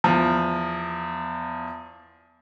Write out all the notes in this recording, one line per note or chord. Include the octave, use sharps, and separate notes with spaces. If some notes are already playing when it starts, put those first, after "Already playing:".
E2 F3